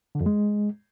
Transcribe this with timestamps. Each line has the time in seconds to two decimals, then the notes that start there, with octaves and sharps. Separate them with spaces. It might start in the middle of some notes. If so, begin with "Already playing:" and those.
0.15 D3
0.21 F2
0.26 G#3